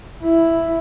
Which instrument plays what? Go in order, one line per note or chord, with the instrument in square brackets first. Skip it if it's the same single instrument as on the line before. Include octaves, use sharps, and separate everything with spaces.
[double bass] E4